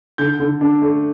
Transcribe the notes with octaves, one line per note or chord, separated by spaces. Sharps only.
D3 G6
D3
D4
A3